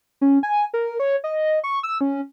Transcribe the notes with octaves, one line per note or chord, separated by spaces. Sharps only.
C#4
G#5
A#4
C#5
D#5
C#6
E6
C#4